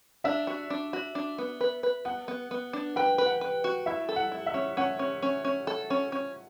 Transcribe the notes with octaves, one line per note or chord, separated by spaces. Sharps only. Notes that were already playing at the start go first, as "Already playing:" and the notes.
D4 E5
F#4
D4
F#4
D4
B3
B4
B4
B3 F#5
B3
B3
D4
B4 G5
B4
F#5
B4
F#4
E4 E5
A4
F#5
E4
E5
C#4
C#4 F#5
C#4
C#4
C#4
A4
C#4
C#4